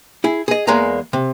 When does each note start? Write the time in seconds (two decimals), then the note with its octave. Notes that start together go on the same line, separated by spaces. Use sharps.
0.24 E4 G#4
0.48 G#4 D#5
0.67 E2 G#3 A#3 D#5 A#5
1.13 C3